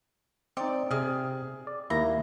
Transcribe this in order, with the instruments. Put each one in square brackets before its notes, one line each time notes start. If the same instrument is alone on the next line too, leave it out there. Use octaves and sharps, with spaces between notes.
[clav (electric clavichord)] C4 D#4 [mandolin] D5
[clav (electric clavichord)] C3 [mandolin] G#4 F6
[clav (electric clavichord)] D5
[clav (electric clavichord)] D#2 A#3 E4 [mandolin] A#5